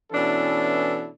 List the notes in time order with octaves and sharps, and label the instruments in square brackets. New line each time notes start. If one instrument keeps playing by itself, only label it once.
[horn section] B2 E3 C#4 D4 E4 A4